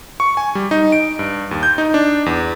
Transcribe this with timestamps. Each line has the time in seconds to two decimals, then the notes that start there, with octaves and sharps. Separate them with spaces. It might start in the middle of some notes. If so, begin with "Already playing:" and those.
0.20 C#6
0.37 G#5
0.55 G3
0.71 D#4
0.92 D7
1.19 G2
1.51 D#2
1.63 G6
1.78 D#4
1.94 D4
2.26 E2